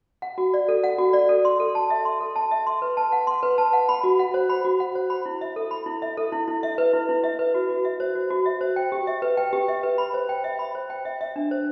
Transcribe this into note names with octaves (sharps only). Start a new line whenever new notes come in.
F#5
F#4
D5
A4
F#5
F#4
D5
A4
C6
A4
A5
E5
C6
A4
A5
E5
C6
B4
A5
F#5
C6
B4
A5
F#5
B5
F#4
F#5
C5
B5
F#4
F#5
C5
B5
E4
E5
A4
B5
E4
E5
A4
E4
E4
E5
B4
E4
E4
E5
B4
F#4
F#4
E5
C5
F#4
F#4
E5
C5
G5
G4
E5
B4
G5
G4
E5
B4
B5
C5
G5
E5
B5
C5
G5
E5
E5
D4
C5